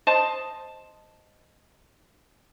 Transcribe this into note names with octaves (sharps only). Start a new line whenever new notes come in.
C5 D#5 A5